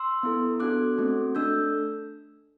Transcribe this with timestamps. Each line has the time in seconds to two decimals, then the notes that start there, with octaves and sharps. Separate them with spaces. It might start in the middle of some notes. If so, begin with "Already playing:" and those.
Already playing: C6 E6
0.23 B3 E4 A4
0.60 B3 D4 F#4 A4 D6 F#6
0.98 A3 C4 F#4 A4
1.35 A3 D4 A4 E6 G6